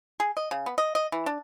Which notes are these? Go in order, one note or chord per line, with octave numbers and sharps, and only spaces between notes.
G#4
D#5
C#3
B3
D#5
D#5
E3
D4